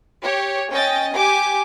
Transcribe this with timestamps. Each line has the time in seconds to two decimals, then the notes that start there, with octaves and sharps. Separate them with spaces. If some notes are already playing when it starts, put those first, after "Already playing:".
0.23 G4 C#5
0.71 C#4 D#5 G5 A6
1.14 G4 G#5 D6